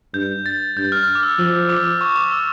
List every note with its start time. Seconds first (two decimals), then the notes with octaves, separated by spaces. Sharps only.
0.14 G2 G6
0.46 A6
0.77 G2 G6
0.92 F6
1.08 F6
1.15 D6
1.23 E6
1.39 F3 E6
1.69 D6
2.01 C#6
2.16 D6
2.32 E6